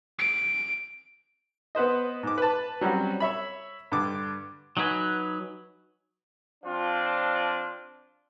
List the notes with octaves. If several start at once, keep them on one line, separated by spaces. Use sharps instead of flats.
D7
B3 B4 C5 D#5
G#2 D6
B4 A5
F#3 G3 C4 C#4 F#4
C#5 E5 B5
G2 D3 D6
F#3 D#4 F#4 B4 G#5
F3 C4 D4 F4